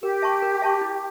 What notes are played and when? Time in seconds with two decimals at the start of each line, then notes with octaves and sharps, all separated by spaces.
0.03 G4 A#4
0.22 E5 A5 C#6
0.42 A#4
0.62 E5 A5 C#6
0.81 E4